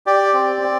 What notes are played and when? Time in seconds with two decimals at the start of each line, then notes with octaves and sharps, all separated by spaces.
0.06 G4 D5
0.33 C4
0.61 C4